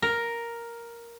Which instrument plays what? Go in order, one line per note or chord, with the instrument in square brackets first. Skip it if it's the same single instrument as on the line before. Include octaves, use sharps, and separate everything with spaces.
[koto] A#4